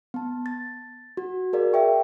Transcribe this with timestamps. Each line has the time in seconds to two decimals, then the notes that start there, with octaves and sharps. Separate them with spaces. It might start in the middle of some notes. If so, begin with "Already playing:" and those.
0.14 B3 A5
0.46 A6
1.17 F#4
1.53 G#4 A#4 D5 F5
1.73 E5 G5 C#6